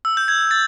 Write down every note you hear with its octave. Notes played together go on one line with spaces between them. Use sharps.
E6
G6
G#6
A6